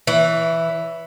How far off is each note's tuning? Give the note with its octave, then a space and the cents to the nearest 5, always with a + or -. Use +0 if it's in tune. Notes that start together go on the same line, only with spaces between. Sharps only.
E3 +0 C#5 +35